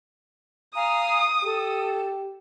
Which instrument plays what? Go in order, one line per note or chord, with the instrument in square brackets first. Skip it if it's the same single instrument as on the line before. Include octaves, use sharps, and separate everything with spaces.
[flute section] F5 G#5 A#5 [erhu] D#6
[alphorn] G4 [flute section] A4